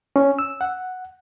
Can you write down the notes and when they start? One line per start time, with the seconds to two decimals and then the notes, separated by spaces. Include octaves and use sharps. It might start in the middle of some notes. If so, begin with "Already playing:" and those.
0.16 C#4
0.39 E6
0.61 F#5